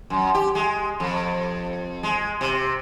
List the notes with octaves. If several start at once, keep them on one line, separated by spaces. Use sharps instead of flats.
F#2
G4
G#3
F2
G#3
C3